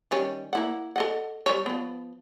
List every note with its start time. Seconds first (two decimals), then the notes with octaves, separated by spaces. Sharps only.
0.11 D#3 G3 C#4
0.53 A#3 E4 F#5
0.96 A4 D#5 F#5
1.46 G3 C5 C#5
1.66 F3 B3